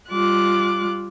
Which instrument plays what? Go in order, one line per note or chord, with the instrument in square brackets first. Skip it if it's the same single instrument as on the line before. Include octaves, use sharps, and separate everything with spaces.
[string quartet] G3 F4 D6 F#6